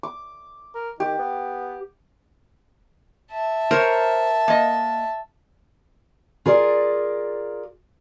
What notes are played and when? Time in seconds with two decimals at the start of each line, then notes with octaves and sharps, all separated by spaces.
0.03 D6
0.75 A#4
1.00 D#3 G4
1.18 B3
3.32 E5 A5
3.71 A#4 C5 C#5
4.48 A#3 D#5
6.46 F4 G#4 A#4 D5